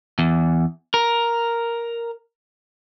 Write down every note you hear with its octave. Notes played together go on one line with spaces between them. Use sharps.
E2
A#4